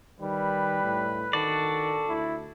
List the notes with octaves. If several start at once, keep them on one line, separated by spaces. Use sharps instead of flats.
D#3 G3 B4
A2
D#3 D4 F#4 A4 D5
D2 E4